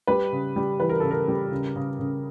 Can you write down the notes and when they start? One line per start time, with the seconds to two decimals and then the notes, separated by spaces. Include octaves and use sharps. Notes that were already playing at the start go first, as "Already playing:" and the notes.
0.07 G3 B4
0.32 C#3
0.56 G3
0.80 E3 B4
0.89 A#4
1.00 C#3 A4
1.11 A#4
1.28 G3
1.52 C#3
1.76 C#3
1.99 C#3